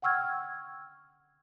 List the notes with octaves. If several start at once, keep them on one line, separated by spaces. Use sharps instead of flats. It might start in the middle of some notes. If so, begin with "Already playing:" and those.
F#5 G5 C#6 E6 F6 G#6